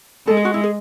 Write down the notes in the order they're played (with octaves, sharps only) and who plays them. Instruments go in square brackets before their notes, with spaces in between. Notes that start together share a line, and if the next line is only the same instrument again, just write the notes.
[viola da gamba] G#3 [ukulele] A4
[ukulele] G#4
F#4
E4
G#4